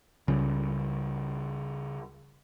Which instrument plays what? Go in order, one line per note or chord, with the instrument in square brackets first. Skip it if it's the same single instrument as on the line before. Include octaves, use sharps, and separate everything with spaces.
[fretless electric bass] C#2 [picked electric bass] C#3 G3